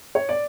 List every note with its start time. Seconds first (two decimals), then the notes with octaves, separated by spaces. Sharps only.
0.15 C#5
0.29 D5